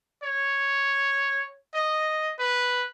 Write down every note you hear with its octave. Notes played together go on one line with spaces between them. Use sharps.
C#5
D#5
B4